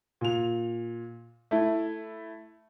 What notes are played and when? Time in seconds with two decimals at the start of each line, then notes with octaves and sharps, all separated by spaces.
0.21 A#2 F7
1.51 A3 E4